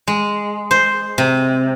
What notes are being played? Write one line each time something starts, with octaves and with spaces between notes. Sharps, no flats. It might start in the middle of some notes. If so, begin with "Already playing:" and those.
G#3
C5
C3